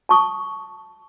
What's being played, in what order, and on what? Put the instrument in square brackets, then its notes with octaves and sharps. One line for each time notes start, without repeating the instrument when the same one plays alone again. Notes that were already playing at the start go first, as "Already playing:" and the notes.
[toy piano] A5 C#6 D#6